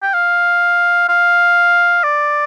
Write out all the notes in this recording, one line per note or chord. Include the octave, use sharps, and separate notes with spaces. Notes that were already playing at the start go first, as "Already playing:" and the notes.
G5
F5
F5
D5